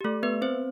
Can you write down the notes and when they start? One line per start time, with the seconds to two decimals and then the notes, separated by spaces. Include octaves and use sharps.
0.01 G4
0.04 A3 A4
0.23 B3 B4
0.42 C4 C5